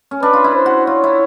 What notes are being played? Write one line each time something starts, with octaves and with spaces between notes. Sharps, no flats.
C#4
D4 B4
F4
E4
C5
F#4
F4 C#5
E4